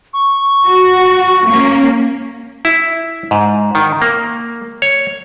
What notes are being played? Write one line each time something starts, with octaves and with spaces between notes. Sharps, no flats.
C#6
F#4
A#3 C#4
E4
G#2
D#3
A#3
C#5